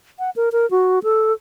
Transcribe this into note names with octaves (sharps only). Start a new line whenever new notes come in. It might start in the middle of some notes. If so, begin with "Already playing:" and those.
F#5
A#4
A#4
F#4
A4